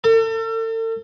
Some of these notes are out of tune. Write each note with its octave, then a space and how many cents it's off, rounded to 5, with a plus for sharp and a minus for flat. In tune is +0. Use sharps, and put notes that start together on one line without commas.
A4 +40